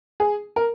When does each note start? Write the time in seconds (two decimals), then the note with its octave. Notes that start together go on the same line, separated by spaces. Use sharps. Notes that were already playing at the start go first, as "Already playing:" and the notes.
0.20 G#4
0.56 A#4